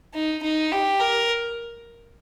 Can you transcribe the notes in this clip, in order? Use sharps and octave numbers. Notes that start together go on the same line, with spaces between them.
D#4
D#4
G4
A#4